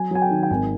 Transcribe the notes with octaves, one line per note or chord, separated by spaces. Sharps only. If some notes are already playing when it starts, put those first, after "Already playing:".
Already playing: F#3 G#5
F#3 G#5
G5
D#3
G5
G#1 G#5